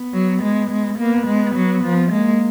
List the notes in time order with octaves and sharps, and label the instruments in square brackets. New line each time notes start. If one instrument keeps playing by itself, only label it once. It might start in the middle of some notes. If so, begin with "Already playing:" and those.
Already playing: [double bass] B3
[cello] F#3
G#3
G#3
[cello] A#3 [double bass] B3
[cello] G#3
F#3
F3
[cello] G#3 [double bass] A#3